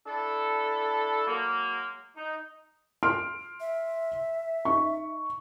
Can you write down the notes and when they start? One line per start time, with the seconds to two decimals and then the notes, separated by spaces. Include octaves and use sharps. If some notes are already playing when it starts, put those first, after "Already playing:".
0.06 D4 E4 A4
1.27 F#3 G#3 A#3
2.17 D#4
3.03 C6 F6 D7
3.60 E5
4.65 D#4 C#6